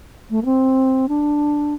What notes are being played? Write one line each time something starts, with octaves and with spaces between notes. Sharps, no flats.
A3
A#3
C4
D4